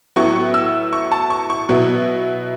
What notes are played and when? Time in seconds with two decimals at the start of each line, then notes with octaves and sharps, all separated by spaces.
0.16 A2 F#3 B3 E4 C#6
0.54 E6
0.93 C#6
1.12 A5
1.30 C#6
1.50 C#6
1.69 B2 F#3 B3 E4